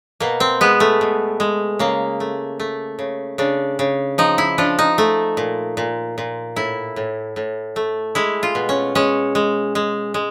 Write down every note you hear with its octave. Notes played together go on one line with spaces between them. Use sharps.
B2 A#3
C4
G#3 B3
A3
B2
G#3
C#3 A#3
A3
A3
C#3
C#3 D4
C#3
F3 D#4
E4
F3 D4
D#4
A3
A#2
A#2
A#2
A2 E4
A2
A2
A3
G#3 E4
F4
B2
C#4
G#3 C#4
G#3
G#3
G#3